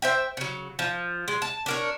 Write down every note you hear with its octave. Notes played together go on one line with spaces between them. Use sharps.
C5 E5 G5
C#3 F#3
F3
G#3
A5
D4 A#4 C#5